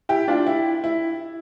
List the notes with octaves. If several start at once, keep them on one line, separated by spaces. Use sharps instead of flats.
E4 G4
D4 F4
E4 G4
E4